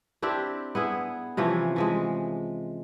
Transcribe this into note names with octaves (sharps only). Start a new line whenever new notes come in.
C4 D4 E4 G4
B3 E4 G#4
C3 E3 F3 C#4
E3 F3 G#3